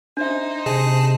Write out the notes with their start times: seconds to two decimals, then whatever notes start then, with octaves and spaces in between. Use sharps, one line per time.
0.17 D4 D#4 C5 E5
0.66 C3 G#4 D#5 G#5 A5